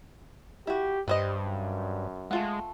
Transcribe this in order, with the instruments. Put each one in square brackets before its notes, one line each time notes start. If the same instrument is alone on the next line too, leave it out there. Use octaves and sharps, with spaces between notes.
[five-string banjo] E4 F#4 [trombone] G4
[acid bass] G2 [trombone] G3 [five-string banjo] B4 C5 D#5
[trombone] F#2
[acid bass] G#3 [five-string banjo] A3 F4 F#5